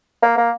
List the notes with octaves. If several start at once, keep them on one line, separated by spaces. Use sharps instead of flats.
A#3
A#3